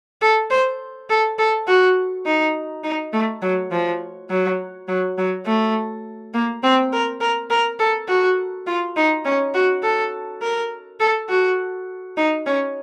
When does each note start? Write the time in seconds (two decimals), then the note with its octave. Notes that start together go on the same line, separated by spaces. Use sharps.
0.22 A4
0.51 C5
1.10 A4
1.39 A4
1.68 F#4
2.26 D#4
2.84 D#4
3.13 A3
3.42 F#3
3.72 F3
4.30 F#3
4.88 F#3
5.18 F#3
5.46 A3
6.34 A#3
6.63 C4
6.93 A#4
7.21 A#4
7.50 A#4
7.80 A4
8.08 F#4
8.67 F4
8.97 D#4
9.25 C#4
9.55 F#4
9.83 A4
10.42 A#4
11.00 A4
11.29 F#4
12.17 D#4
12.47 C#4